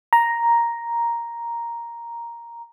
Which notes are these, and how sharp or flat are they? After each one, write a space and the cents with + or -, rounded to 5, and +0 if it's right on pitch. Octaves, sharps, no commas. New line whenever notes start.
A#5 +5